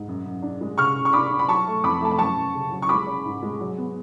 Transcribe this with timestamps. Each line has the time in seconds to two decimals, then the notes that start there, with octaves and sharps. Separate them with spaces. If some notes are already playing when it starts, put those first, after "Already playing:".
Already playing: G#2
0.08 F#2
0.25 F#2
0.42 D4
0.61 G#3
0.78 C#3 C#6 F6
0.95 C#3
1.05 C#6
1.13 D4 B5 D6
1.31 D4
1.39 B5
1.48 F#3 A5 C#6
1.67 A3
1.84 F2 B5 D6
2.01 A3 A5
2.11 B5
2.19 F#2 A5 C#6
2.36 F#2
2.55 C#3
2.72 F#3
2.82 C#6
2.89 G#3 B5 D6
3.07 C#4
3.25 G#2
3.43 G#3
3.60 F#3
3.78 B3